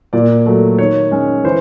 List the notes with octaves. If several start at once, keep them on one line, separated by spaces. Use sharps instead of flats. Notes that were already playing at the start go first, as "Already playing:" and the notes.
A#2 D5
F#3 A3
D#3 C#5
G#3 C#4
E3 C5